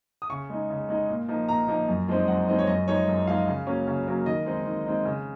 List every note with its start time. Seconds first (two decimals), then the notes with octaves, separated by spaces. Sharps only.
0.22 D#6
0.30 C#3 C#6
0.50 G#3 D#4
0.70 C#3
0.89 G#3 D#4
1.09 A#2
1.29 F3 A#3 D#4
1.49 A#2 A#5
1.68 F3 A#3 D#4
1.88 F#2
2.08 F3 G#3 C4 D#4
2.28 F#2 F#5
2.48 F3 G#3 C4 D#4
2.59 C#5
2.67 F#2 D#5
2.88 F3 G#3 D#4 C#5
3.08 F#2
3.27 F3 G#3 D#4 F5
3.48 C#3
3.66 F#3 A#3 C#4
3.87 C#3
4.07 F#3 A#3 C#4
4.26 D#3 D#5
4.46 G#3 C4 D#4
4.66 D#3
4.86 G#3 C4 D#4
5.05 C#3